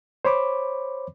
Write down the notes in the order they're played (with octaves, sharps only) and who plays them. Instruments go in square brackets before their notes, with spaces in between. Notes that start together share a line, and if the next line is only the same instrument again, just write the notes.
[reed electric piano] C5 C#5 B5 D6